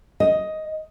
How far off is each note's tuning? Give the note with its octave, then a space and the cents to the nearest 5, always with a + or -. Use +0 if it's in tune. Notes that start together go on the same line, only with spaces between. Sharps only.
D#5 +10